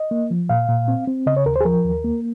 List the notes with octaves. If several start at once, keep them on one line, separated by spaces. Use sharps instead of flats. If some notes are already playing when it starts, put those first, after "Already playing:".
Already playing: D#5
A#3
F3
A#2 F5
A#2
C4
C4
C#3 D#5
C#5
D#2 A#4
C5
G#4
F3 A#4
D#2
A#3